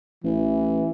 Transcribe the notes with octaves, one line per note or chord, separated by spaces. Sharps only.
A1 E3